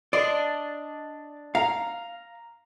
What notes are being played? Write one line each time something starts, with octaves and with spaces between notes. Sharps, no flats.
D4 D5 D#5 C6
F5 A#5